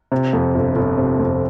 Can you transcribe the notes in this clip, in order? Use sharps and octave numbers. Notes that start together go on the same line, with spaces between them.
C3
F2
G1
G1
C3
F2